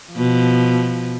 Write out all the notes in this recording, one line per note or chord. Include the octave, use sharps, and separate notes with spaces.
B2 F3